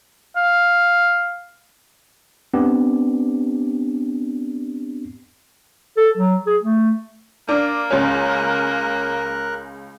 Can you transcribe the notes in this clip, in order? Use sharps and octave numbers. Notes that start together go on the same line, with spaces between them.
F5
B3 C4 D4 G4
A4
F#3
G#4
A3
A#3 D4 A#4
C#2 C#4 A#4 F#6